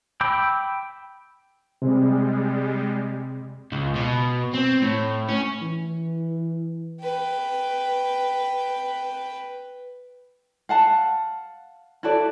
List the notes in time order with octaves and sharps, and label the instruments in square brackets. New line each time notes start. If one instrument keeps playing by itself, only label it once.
[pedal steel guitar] G5 B5 D6 E6 G6
[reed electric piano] C3 C4 [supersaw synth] G3 G#3
[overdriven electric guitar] C#2
B2
C4
A2
C#4
[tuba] E3
[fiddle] B4 G5
[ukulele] F5 F#5 A5
E4 F#4 A4 D5